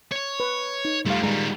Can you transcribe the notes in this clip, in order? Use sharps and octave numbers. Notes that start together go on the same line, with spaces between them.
C#5
B4
D#4
G3 A3 F4 F5
D#3 G3 G#3 G#4 A#5